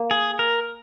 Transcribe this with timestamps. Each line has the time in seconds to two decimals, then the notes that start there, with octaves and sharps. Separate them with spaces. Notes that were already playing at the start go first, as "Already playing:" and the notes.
Already playing: A#3
0.11 G#4
0.39 A#4